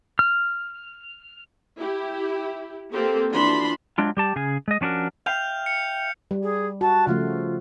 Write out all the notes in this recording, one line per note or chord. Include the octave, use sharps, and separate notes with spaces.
F6
E4 G4
A#3 C4 G4 A4
E3 F3 D4 F#4 B5 C6
F#3 G#3 D4 F4
G3 G4 A5
C#3 G#4 G#5
G#3 D#5
F3 C#4 D4 F#4 A#4
E5 F5 G5 F6 G6 F7
C#7
G3
G#4
F#4 A5
C#3 F3 A3 F4